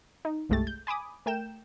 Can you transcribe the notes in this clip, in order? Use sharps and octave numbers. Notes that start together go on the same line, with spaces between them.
D#4
G1 C2 G#3 A3 G4 A6
G6
G#5 B5 D6 D#6
A3 A#4 G5 G6 E7